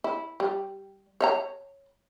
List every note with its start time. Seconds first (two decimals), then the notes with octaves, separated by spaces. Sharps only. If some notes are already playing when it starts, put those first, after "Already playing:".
0.04 E4
0.40 G3
1.21 C#5 E5 A#5